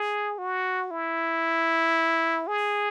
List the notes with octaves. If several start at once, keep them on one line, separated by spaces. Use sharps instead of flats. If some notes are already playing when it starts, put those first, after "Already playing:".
Already playing: G#4
F#4
E4
G#4